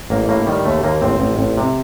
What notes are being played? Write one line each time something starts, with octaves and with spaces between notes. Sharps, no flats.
A1 A#3
A2 A#3
D#3 G3
D#2 A3
D#2 A#3
A1 C4
A1
A1
C3